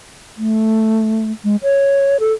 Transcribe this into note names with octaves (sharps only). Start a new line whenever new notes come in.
A3
G#3
C#5
A4